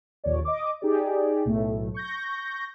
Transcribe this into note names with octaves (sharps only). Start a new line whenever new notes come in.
A#1 D#2 A#2 C#5 D5
D#5 D6
D#4 G4 G#4 D5
B1 A2 A3
C#6 G6 A#6